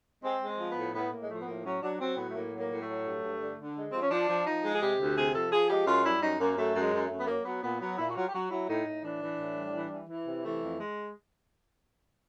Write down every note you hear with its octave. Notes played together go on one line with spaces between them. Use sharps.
G#3 C4
G#3
C4
F3
B3
A2
A2 B3
A2 A#3
G#3
F3 A3
B3
A2 A#3
F#3 C#4
F#3 D4
F#3 C4
A2 B3
A3
A2 A#3
F#3
A#3
A2
A3
F#3
G2
G2
D3
D3
G#3
F3 C4
C#4
F3 D4
F3
F3 D#4
G#3
G#4
C3 G4
D2
C3 G#4
F3 A4
F3 G#4
G#3 G4
F#2 F4
G3 E4
F#2 D#4
F#2 A#3
F#2 A3
F#2
G#3
F#2
A3
F#2
B3
F#3 A#3
F#3 B3
A#2 B3
F#3 B3
A#2 E4
F#4
F#3 F4
G4
F#3 F#4
F#3 E4
A2 D#4
A2
E3 D4
E3
A2
G3
E3
E3
E3
C3
E3 A3
F2
G#3